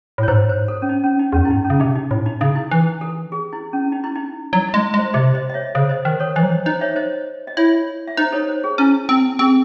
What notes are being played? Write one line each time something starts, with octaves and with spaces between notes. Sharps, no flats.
A2 C#5
G#2 C5
C5
A4
C#4
D#4
C#4
D#4
E2 C#4
F#2
E4
G#2 D#4
C#4
C#3
C3 D#4
D#4
A2 D#4
D#4
C#3 D#4
E4
E3
A4
G#4
E4
C#4
D#4
E4
D#4
F#3 E4
E4
G#3
G#3
C5
C3 C5 D#5
C5 D#5
D#5
C#5 E5
C#3 C5 D#5
C5 D#5
D#3 C5
A4 C#5
E3 C5 D#5
F#3
E3
D#4 C5 D#5
C#5 E5
C5 D#5
D#5
E4 C#5 E5
E5
D#4 C5 D#5
A4 C#5
C5
G#4
C#4 E4
C4
C4 G#4